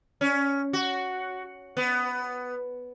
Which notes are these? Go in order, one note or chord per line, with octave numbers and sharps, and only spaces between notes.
C#4
F#4
B3